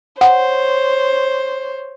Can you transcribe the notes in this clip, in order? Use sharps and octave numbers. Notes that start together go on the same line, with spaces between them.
C5 C#5 F#5